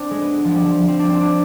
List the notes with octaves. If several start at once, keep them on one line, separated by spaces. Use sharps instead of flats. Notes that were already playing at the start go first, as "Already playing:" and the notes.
Already playing: C4 D4
G#3
B3
G#3
F3
G3
F3
C4
D4
C4
D4